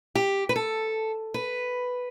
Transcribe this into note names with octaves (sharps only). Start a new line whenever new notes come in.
G4
B4
A4
B4